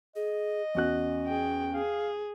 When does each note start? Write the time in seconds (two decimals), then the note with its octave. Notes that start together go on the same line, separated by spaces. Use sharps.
0.16 G#4 D#5
0.75 E2 C#4 F#4 F#6
1.27 G#4 G5
1.74 G#4 F5